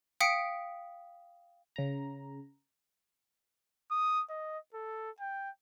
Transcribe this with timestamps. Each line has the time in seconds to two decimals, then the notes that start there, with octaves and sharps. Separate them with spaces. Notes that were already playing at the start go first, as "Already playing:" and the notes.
0.20 F5 G5 D#6 B6 C#7 D7
1.76 C#3 A#5
3.91 D#6
4.30 D#5
4.74 A4
5.20 G5